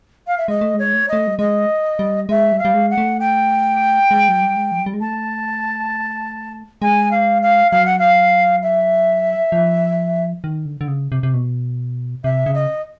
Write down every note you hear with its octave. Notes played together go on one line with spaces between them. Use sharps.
F5
E5
G#3 D#5
A3
G#3 C#5
A3
A3 D#5
G3
G#3 D#5
G3
G#3 E5
G3
F5
G3
G#3
F#5
A3
G5
G#3
F#3
G3
G#3
F3
F#3
G3
G#3
A3 A5
G#3 G#5
F5
F5
F#3 F5
F#5
F5
E5
F3
D#3
D3
D3
C#3
C3
C3
B2
C3 E5
C#3
D#5